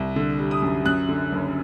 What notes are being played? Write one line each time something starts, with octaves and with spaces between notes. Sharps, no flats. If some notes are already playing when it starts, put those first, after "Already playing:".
Already playing: C2
D3
G3
D#6
F#2
F#2 F#6
D3
F#1